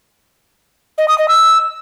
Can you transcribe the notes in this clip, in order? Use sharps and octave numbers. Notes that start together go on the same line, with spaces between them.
D#5
D#6
D#5
E6